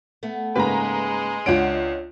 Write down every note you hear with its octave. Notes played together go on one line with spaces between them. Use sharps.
A3 B3
G#2 C#3 G#3 A#3 B4 G#5 A#5 C6
C#2 D4 F4 C#5 D#5 F#5 D7